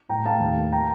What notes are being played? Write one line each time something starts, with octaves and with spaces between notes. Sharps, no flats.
A2 G5 A#5
A3 F5 A5
D#2
A#3
G5 A#5